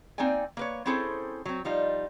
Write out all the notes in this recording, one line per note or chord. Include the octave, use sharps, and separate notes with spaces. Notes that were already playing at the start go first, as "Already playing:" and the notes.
A#3 C4 D#4 D5 G5 G#5
A#3 B4 C#5
C4 C#4 E4 G#4 A4 C5
F#3 C4
F3 G3 D#4 F4